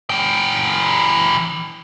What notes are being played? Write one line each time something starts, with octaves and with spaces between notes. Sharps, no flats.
E3 G5